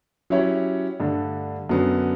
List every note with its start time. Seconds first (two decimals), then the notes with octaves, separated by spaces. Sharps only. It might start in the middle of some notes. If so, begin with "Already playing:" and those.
0.30 F#3 C#4 E4 G4 C#5
1.00 G2 D3 A3
1.69 F#2 D3 F#3 B3